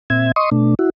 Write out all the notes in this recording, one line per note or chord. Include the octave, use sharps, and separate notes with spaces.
A#2 C4 E5 G#6
D#5 C6 C#6 D#6
B2 A3 D4
E4 F#4